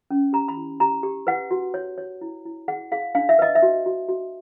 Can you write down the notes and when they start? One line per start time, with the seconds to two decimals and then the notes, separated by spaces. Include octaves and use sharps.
0.10 C#4
0.33 G4 A#5
0.48 B5
0.57 E4
0.80 G4 A#5
1.03 G4
1.27 B4 F#5
1.51 F#4
1.74 C#5
1.98 C#5
2.21 E4
2.45 E4
2.68 G#4 F#5
2.92 G#4 F5
3.15 D4 F5
3.29 E5
3.39 B4 D#5
3.55 E5
3.62 F#4
3.86 F#4
4.09 F#4